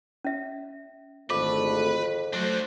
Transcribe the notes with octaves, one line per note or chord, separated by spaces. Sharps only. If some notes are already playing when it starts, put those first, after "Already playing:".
C#4 E5
G#1 F2 D3 A3 B4 D6
F#3 A3 D4 F#4 C5